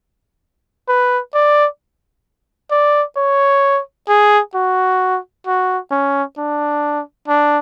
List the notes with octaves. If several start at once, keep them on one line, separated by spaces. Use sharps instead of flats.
B4
D5
D5
C#5
G#4
F#4
F#4
C#4
D4
D4